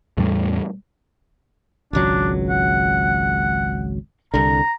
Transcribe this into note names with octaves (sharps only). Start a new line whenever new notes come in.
E2 A2 G3 A3
G#1 C#2 F#3 D4
F#5
C2 D3 A#5